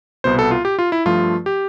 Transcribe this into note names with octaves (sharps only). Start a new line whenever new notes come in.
C2 B2 B3 C5
A4
F4
G4
F4
E4
G2 F3 A3 F4
G4